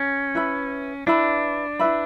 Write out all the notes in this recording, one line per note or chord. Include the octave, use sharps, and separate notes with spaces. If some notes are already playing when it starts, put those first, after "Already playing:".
Already playing: C#4
E4 B4 E5 B5
D4 E4 B4 E5 B5
E4 B4 E5 B5